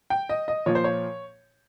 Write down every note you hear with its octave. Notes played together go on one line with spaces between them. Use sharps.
G5
D#5
D#5
A#2 F3 C#5
C5
C#5